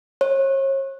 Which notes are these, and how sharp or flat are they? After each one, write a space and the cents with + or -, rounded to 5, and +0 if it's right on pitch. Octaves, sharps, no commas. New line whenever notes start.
C#5 -40